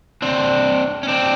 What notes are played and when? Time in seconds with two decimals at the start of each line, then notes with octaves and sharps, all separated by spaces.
0.22 C4 D4
1.03 C#4
1.08 C4 D4